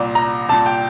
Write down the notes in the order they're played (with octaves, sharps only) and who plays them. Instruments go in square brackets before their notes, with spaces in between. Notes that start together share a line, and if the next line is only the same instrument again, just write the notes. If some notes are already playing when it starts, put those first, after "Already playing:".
Already playing: [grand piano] C2 A#2
A#5
C2 A5
A#2
G5